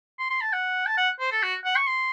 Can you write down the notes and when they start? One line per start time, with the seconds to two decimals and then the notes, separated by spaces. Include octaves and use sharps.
0.19 C6
0.30 C6
0.41 A5
0.53 F#5
0.86 A5
0.97 F#5
1.20 C5
1.32 A4
1.43 F#4
1.65 F#5
1.76 C#6
1.87 C6